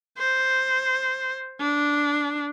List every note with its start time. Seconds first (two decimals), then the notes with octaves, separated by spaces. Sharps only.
0.18 C5
1.60 D4